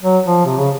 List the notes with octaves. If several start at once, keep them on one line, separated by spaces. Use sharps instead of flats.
F#3
F3
C3
C#3